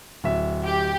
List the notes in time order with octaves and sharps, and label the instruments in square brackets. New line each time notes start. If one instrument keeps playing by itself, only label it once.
[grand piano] D1 E5
[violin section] G4